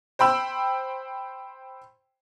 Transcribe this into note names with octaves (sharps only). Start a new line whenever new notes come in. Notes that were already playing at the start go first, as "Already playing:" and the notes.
C5 G5 B5 E6